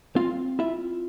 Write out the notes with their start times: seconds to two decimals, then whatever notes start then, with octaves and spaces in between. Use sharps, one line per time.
0.16 C4 F4 F5
0.59 E4 F4 E5